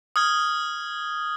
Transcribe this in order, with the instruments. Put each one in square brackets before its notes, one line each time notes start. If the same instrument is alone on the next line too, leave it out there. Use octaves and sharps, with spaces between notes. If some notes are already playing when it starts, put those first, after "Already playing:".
[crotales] D#6 F6 G#6 G7